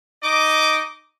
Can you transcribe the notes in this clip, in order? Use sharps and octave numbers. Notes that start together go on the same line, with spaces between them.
D#4 D#5 D6